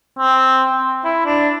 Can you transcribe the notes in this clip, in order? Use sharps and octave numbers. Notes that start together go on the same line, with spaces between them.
C4
E4
D4